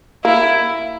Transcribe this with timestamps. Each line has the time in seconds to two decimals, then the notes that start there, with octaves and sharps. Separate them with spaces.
0.24 A#3 E4